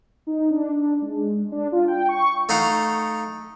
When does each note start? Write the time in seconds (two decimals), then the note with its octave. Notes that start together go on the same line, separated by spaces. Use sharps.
0.27 D#4
0.51 D4
1.02 G#3
1.52 D4
1.72 F4
1.88 G5
2.09 C#6
2.49 A3 D#4 F5 F#5